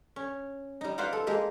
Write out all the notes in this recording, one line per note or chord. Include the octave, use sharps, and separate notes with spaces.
C#4
G3 D#4
F4 B4 C5 D5 F5 F#5
A4
G#3 A#3 G4